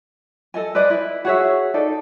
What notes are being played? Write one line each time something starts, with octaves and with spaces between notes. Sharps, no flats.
A4 D#5 G#5
B4 C5 D5 D#5
E4
F#4 G#4 C#5 E5
D#4 A4 D5